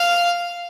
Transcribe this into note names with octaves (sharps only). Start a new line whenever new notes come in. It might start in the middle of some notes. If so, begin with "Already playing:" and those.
Already playing: F5